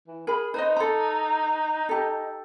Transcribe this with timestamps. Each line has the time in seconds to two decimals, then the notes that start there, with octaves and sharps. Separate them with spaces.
0.08 E3
0.27 G#4 A#4 B5
0.54 D#4 B4 C5 D#5
0.76 A4 A#5
1.89 G4 A4